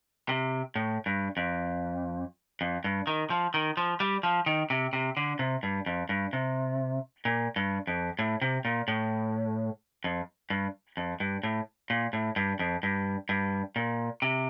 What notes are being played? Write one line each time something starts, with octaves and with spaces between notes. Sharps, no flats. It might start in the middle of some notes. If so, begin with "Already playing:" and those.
C3
A2
G2
F2
F2
G2
D#3
F3
D#3
F3
G3
F3
D#3
C3
C3
D3
C3
G2
F2
G2
C3
A#2
G2
F2
A2
C3
A#2
A2
F2
G2
F2
G2
A2
A#2
A2
G2
F2
G2
G2
A#2
C3